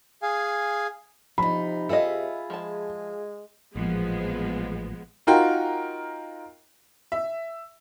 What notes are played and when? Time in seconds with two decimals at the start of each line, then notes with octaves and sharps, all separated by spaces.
0.22 G#4 F5 G#5
1.38 C3 F3 D#4 B5
1.89 F4 G#4 A4 D#5 E5
2.50 F3 G#3 A5
3.76 A1 A#2 F3 G#3 B3
5.27 D#4 F4 F#4 A#4 G5
7.12 E5